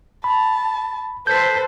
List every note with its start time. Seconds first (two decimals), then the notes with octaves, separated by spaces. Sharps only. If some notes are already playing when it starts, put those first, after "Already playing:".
0.24 A5 B5
1.27 A4 B4 C5 G6 B6